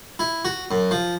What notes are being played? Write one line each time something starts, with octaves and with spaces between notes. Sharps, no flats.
E4
F#4
F#2
F3